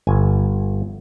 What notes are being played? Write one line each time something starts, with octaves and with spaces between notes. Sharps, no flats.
G1 G#5